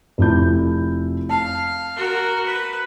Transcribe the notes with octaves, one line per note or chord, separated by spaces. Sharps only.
F1 E4 G6
F5 A5
F#4 A#4
B4